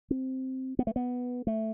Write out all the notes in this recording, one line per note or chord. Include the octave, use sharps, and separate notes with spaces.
C4
B3
A3
B3
A3